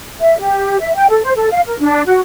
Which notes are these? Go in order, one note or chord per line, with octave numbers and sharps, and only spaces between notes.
E5
G4
E5
G5
A4
C5
A4
F5
A#4
D4
F#4